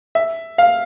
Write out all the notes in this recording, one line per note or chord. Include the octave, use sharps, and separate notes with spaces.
E5
F5